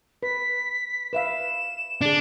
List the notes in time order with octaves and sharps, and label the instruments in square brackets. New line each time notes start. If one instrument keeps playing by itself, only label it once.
[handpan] B4 [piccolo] B6
[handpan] B4 E5 F5 [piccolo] E7
[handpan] D3 G#4 [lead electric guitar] D4